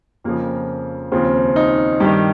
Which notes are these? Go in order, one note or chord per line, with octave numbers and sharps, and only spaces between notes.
F2 C#3 F3 A#3
D#2 C#3 F3 C4
D#4
G2 D#3 G4